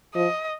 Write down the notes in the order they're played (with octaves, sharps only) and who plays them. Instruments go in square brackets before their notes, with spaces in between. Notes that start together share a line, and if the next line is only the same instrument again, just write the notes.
[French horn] F3 [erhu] D#5